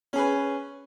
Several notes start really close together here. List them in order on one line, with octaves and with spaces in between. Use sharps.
C#4 G#4 B4